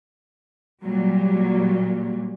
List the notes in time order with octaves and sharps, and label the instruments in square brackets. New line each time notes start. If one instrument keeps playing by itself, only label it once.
[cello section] A#2 F#3 G3